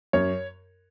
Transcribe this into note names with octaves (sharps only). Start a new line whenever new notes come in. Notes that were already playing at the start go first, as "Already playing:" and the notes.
F#2 C#5